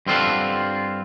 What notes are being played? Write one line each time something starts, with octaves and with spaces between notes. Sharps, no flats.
G2 C4 F4 A4 F#5